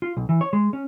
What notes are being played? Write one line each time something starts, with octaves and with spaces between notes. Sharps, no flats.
F4
B1
E3
C#5
G#3
C#4